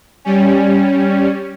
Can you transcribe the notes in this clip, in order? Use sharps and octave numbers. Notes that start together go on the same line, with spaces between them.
G3 C#4